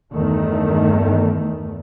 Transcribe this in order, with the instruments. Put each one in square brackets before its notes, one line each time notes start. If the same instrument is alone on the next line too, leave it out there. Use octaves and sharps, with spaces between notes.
[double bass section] E2 G2 D#3 A3